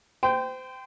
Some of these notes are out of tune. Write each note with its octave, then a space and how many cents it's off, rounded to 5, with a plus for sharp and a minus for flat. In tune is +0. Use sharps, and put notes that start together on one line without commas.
C5 -30 G5 +0